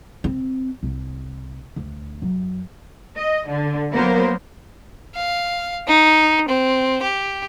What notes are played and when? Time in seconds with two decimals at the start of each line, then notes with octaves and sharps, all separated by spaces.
0.24 C4
0.83 C2
1.76 D2
2.22 F#2
3.17 D#5
3.48 D3
3.92 F#3 A#3 B3 A#4 C5
5.15 F5
5.88 D#4
6.48 C4
7.03 G4